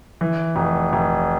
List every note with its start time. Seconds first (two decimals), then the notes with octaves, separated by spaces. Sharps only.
0.21 E3
0.56 F1
0.93 F1